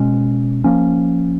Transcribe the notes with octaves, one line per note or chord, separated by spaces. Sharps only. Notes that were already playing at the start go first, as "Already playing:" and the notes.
Already playing: B2 G#3 C#4
F3 A#3 C#4